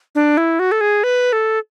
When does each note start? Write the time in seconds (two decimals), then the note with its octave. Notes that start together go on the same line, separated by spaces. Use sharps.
0.15 D4
0.37 E4
0.59 F#4
0.72 A4
0.81 G#4
1.04 B4
1.33 A4